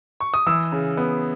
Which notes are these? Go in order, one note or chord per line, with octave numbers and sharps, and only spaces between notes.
C#6
D#6
E3 E6
C#3
B3